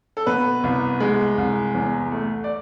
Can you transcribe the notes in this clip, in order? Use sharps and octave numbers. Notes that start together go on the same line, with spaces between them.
A4
B2 B4
C2
G#3
C2
E2
A3
D5